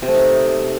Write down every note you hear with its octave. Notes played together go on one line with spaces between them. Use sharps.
C3
A3
D#4